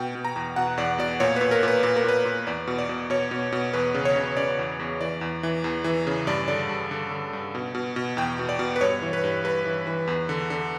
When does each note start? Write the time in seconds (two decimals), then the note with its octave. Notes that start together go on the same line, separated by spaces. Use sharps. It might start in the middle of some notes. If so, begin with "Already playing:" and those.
Already playing: B2 G5
0.15 B2
0.25 A#5
0.36 E2
0.56 B2 F#5
0.77 E2 D5
0.98 B2 D5
1.20 A#2 C#5
1.36 A#2 B4
1.51 A#4
1.63 A#2 B4
1.83 A#2 B4
1.96 A#4
2.04 A#2 B4
2.25 A#2
2.47 E2 D5
2.67 B2
2.78 D5
2.89 B2
3.10 B2 C#5
3.31 B2
3.52 B2
3.73 E2 B4
3.94 C#3
4.05 C#5
4.16 C#3
4.37 C#3 D5
4.59 E2
4.79 E2
5.01 E3 D5
5.21 E2
5.43 E3
5.64 E2
5.84 E3
6.07 C#3
6.27 G2 D5
6.48 D3 D5
6.69 G2
6.91 D3
7.11 D3
7.33 G2
7.55 B2
7.75 B2
7.96 B2
8.17 E2 G5
8.39 B2
8.49 D5
8.59 B2
8.76 B4
8.81 G2 C#5
9.02 E3
9.13 B4
9.24 G2
9.44 G2 B4
9.65 E3
9.87 E3
10.07 E2
10.29 D3
10.50 D3